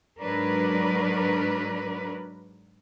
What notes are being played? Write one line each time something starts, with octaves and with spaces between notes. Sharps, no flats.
G#2 F#3 D4 A#4 B4